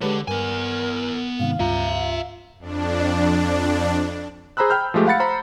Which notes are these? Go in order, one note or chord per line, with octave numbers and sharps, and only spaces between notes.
D3 G#3 G4 B4 C#5
G2 B3 A#4 G#5
G#2 C3 D#3 F5
C#2 G2 F4 E5 A#5
F2 D4
G#4 C5 A#5 B5 E6 F#6
G5 B5 F6 G6
F3 G#3 A3 G4
F5 F#5 B5 A6 C#7
C5 A#5 B5